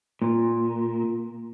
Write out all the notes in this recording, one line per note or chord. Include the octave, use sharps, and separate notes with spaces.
A#2